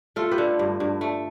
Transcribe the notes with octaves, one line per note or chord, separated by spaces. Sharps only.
A3 F4 A4
G4 B4
D3
G2
G2
A3